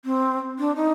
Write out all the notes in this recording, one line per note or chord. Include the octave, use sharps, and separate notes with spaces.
C4
D4
D#4